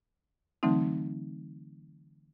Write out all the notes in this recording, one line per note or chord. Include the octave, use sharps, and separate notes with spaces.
D3 E3 F#3 A3 C4 D#4